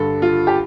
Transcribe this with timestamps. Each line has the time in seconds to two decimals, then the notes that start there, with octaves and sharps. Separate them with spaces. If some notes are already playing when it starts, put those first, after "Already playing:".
Already playing: G2 D3 A4
0.22 F4
0.47 G4